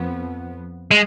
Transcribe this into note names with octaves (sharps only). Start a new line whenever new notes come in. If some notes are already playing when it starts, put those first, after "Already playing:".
Already playing: F2 F3 B3
G#3